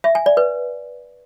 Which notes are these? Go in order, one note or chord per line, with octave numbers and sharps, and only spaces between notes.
E5
G#5
D5
B4